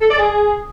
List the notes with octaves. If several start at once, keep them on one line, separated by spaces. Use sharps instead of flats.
A4
D5
G#4